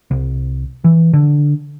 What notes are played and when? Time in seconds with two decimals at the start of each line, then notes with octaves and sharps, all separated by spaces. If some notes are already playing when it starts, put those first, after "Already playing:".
0.11 C2
0.84 E3
1.14 D3